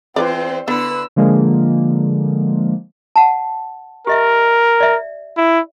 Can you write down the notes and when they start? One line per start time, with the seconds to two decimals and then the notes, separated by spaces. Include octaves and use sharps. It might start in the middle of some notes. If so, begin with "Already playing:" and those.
0.16 E2 C4 F4 B4 C5 D5
0.68 D3 B3 E4 B4 E6
1.16 D3 F3 G#3 A#3
3.16 F#5 A5
4.07 G4 A#4 D#5 E5
4.80 D5 E5
5.37 E4